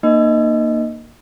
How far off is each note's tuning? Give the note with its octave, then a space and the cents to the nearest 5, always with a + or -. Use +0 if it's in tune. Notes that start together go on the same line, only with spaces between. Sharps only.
A#3 +0 D#4 -35 D#5 +0